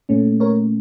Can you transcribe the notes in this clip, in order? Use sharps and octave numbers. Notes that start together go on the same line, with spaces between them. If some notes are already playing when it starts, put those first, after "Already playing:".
A#2 A3 C#4
A#4 C#5